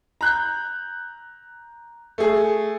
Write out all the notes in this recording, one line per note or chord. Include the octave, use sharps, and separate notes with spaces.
A#5 F#6 G6
A3 G#4